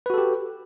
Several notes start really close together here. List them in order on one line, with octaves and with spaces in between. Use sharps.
B4 F#4 A4 G4